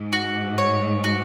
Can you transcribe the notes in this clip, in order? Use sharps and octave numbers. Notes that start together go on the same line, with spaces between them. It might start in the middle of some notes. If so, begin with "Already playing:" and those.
Already playing: G#2
F#4
C#5
F#4